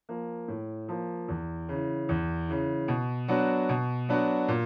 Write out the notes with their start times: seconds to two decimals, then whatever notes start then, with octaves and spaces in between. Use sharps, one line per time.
0.09 F3 A#3
0.48 A2
0.89 F3 A#3
1.29 E2
1.69 C#3 E3
2.09 E2
2.49 C#3 E3
2.88 B2
3.28 F#3 B3 D4 F#4
3.69 B2
4.09 F#3 B3 D4 F#4
4.48 A#2